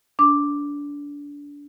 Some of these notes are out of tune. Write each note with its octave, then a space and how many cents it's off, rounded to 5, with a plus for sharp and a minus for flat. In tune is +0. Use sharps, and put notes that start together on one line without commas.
D4 -25 D6 +0